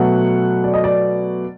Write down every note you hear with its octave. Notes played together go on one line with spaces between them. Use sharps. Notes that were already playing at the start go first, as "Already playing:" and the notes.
Already playing: B2 F#3 A3 F#5
D5
D#5
D5